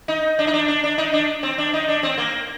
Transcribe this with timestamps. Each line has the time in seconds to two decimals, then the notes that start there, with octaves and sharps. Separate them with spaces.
0.08 D#4
0.39 D4
0.47 D#4
0.54 D4
0.68 D4
0.84 D4
0.98 D#4
1.13 D4
1.43 C4
1.58 D4
1.73 D#4
1.88 D4
2.03 C4
2.18 A#3